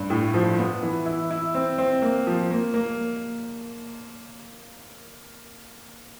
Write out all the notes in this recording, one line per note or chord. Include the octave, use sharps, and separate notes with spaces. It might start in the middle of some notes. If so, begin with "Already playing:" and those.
Already playing: G2
A2
F3
B3
E3
E4
E4
C4
C4
A#3
F3
A#3
A#3